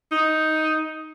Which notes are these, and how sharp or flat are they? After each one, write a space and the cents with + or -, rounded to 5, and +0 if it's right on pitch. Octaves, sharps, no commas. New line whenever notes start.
D#4 +10